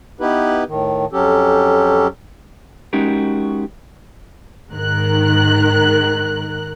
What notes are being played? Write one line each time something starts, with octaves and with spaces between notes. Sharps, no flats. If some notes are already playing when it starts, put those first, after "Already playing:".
B3 D#4 E4 G4 B4
A2 D#3
F2 F#3 C#4 G4 A4
G#3 C#4 D#4 F#4 G4 A#4
G#2 D#3 A#4 F#6